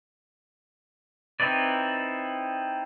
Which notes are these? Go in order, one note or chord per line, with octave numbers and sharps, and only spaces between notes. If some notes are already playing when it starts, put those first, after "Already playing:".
C4 D#4 E4 B4 D5